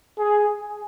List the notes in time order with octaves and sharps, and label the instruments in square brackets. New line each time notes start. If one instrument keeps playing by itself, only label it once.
[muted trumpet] G#4